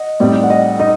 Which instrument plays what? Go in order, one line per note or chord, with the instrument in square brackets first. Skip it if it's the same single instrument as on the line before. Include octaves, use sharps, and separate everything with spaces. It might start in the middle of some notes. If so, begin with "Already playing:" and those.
Already playing: [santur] D#5 F#5
[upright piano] A2 G3 C4 D#4 [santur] D5
[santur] F#5
D#5
[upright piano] D#4 [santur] D#5